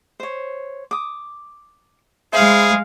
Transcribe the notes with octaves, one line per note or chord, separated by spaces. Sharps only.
C5 C#5
D6 D#6
G#3 G#4 C5 E5 F5 B5